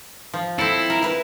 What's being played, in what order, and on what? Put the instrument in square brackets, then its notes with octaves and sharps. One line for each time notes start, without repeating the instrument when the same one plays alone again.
[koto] F3
[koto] C4 A4 [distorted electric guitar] E4
[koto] A#4
E4 B4